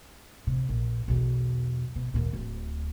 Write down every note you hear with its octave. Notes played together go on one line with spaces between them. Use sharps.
C3
A#1
B1 E2
B2
D#2 A#2
D1